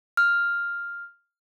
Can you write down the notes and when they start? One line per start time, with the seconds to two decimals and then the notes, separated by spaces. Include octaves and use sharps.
0.17 F6